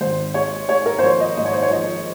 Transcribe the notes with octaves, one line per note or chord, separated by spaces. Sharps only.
G#1 C5
G#3 C#5
G#3 C#5
A#4
C5
F3 C#5
D#5
G#2 D#5
C#5
C5
C#5
F3 D#5